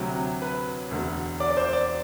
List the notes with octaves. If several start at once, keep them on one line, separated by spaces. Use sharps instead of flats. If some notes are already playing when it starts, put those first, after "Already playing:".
Already playing: D2 C3 F#3
B4
E1 D2 D3
D5
D5
C5
D5